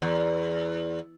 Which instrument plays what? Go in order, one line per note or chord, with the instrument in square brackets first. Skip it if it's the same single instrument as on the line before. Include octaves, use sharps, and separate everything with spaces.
[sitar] E2